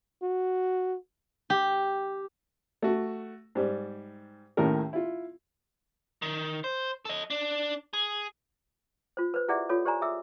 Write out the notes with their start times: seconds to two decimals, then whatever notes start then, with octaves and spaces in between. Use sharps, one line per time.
0.22 F#4
1.50 G4
2.82 A3 F#4
3.55 G#2 G3
4.57 D#2 A2 D#3 C#4 A#4
4.93 E4 F4
6.22 D#3
6.64 C5
7.05 A4 D#5
7.30 D4
7.93 G#4
9.17 F4 C5
9.34 B4 C5
9.48 E4 G4 G#4 D5 E5 F#5
9.69 F4 A4 C#5
9.85 G4 C5 D5 G#5 A#5
10.02 G#4 E5 D#6 E6